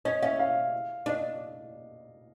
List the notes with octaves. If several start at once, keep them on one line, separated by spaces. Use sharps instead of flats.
C#4 D#5
C#4 E5
F5
D4 D#5